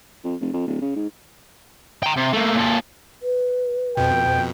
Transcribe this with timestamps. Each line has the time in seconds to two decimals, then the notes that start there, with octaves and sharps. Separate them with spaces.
0.24 F2
0.41 F1
0.53 F2
0.67 D1
0.81 C#3
0.96 G#2
2.03 G5 A#5
2.16 C3
2.33 A3 A#3
2.55 A#2 A4
3.23 B4
3.97 F2 B2 G5